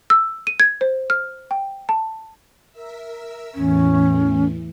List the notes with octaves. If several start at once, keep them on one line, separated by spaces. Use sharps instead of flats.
E6
D#7
G#6
C5
F6
G5
A5
A#4 E5 E6
E2 A2 E3 C#4